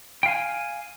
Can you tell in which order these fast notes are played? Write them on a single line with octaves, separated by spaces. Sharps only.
G5 F5 G#5